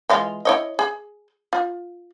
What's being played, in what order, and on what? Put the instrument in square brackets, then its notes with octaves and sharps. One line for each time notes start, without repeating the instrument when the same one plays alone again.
[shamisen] E3 G#3 F4
E4 C#5 D#5
G#4
F4